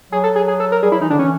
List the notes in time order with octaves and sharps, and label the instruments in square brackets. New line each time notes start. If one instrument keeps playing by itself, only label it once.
[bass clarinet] F#3 [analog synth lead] G#4
[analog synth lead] A4
G#4
G#4
A4
A#4
[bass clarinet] G3 [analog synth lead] G#4
[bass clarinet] F#3 [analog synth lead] E4
[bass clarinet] E3 [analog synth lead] D#4
[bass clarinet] D3 [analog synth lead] D4
[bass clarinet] E3 [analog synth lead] C#4